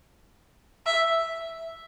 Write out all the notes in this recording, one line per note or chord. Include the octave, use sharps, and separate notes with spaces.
E5